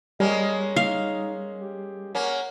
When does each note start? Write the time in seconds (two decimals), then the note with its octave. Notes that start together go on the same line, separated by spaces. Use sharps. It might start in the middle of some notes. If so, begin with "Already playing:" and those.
0.20 G3 G#3 A#3 C#4 D#5
0.76 D#4 F5
1.62 G4
2.15 A#3 C#4 F#5